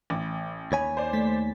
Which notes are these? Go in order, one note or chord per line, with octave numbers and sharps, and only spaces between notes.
A1 D6
D#2 C#5 G#5 B5
C5 D5
A3 A6 B6